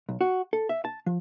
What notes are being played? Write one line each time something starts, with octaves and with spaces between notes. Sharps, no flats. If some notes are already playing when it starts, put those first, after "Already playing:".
B1
F#4
A4
E5
A5
F3